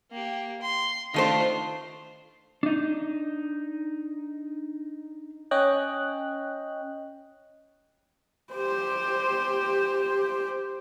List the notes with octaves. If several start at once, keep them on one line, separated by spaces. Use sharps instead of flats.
A#3 G4
C6
D#3 A3 D4 F4 C5
D4 D#4
C#4 C#5 D#5 G5 F#6
G4 C5